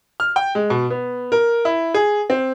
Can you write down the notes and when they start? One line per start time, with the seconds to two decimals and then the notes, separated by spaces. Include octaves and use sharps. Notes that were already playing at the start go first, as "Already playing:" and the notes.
0.20 F6
0.36 G5
0.55 G#3
0.70 B2
0.90 B3
1.32 A#4
1.65 E4
1.94 G#4
2.30 C4